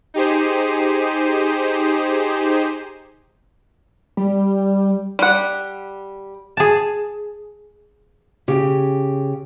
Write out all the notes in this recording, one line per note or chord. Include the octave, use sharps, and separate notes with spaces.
D#4 G4 G#4 C5
G3
G3 F#5
G#4 A5
C#3 G4